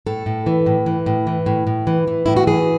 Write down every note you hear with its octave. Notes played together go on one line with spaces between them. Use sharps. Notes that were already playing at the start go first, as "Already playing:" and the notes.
A2 A4
A2
E3
A2
E3
A2
E3
A2
A2
E3
E3
A2 E4
F#4
E3 G#4